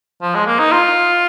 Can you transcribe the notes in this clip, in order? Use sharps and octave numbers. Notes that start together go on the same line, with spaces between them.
F3
G#3
A#3
D#4
F4